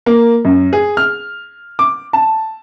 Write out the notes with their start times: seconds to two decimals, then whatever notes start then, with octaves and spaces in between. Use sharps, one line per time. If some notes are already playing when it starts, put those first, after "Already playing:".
0.06 A#3
0.45 F#2
0.73 G#4
0.97 F6
1.79 D6
2.13 A5